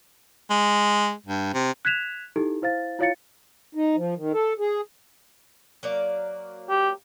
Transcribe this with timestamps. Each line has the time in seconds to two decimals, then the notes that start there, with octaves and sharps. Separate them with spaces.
0.50 G#3
1.26 G2
1.54 C3
1.85 F#6 G#6 B6 E7 F7
2.36 D#4 E4 G4 A4
2.62 E4 C5 F5 A6
2.99 E4 F4 C#5 F5 A6 C#7
3.75 D#4
3.96 F3
4.16 D#3
4.33 A4
4.59 G#4
5.83 F#3 A#3 D5
6.70 G4